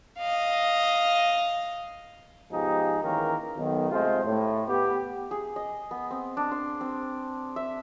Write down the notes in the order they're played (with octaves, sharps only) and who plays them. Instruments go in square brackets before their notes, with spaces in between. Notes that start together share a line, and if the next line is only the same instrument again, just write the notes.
[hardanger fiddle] D#5 F5
[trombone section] G#2 B2 F3 D#4 G4 G#4
D#3 E3 A#3 C#4 G#4 A#4
B1 D#3
C3 G#3 A3 F4 C5
A2
B3 G4
[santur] G#4
D#5
B3
C4
D4
C6
C4
E5